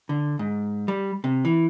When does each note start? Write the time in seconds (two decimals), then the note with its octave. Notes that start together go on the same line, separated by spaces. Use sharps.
0.09 D3
0.39 G#2
0.88 G3
1.24 C3
1.45 E3